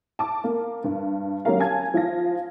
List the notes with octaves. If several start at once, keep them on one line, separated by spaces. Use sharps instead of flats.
A5 D6
A#3
G2
F#3 A#3 C#4 G4 A#4 F5
G#5 A5 G#6
F3 F4 F5 A#6